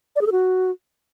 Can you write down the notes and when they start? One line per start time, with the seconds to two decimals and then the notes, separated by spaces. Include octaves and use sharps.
0.16 D5
0.21 G#4
0.27 A4
0.32 F#4